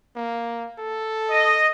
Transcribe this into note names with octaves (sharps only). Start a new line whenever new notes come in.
A#3
A4
D#5